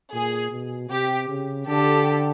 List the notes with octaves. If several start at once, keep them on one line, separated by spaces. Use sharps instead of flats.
A#2 G#4
B2
C3 G4
C#3
D3 G4 A4